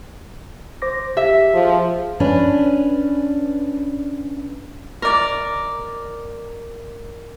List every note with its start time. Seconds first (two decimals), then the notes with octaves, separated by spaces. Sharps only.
0.82 C5 D6 A#6
1.17 G4 E5
1.54 F3 G#4 F5
2.20 C#4 D4 B4
5.02 A#4 D5